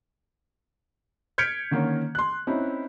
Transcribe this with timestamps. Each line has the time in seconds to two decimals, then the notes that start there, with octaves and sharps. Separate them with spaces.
1.38 F6 G6 G#6 B6 C#7 D7
1.71 D3 D#3 A#3 C#4
2.15 C6 F#6
2.47 C4 C#4 D#4 E4